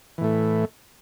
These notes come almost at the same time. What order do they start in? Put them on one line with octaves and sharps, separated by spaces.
E3 A2 A3